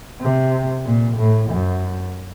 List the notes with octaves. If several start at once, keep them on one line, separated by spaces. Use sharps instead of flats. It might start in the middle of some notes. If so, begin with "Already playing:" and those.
C3
A#2
A2
F#2